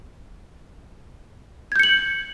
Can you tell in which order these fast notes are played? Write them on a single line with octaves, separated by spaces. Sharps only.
G#6 G6 C#7 F#7